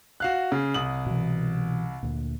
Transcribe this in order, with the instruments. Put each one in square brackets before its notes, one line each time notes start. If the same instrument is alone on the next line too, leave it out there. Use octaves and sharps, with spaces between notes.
[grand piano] F#4 F5 F#6
C#3
C2 D#6 F#7
[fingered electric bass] B2 E3
D2 A#2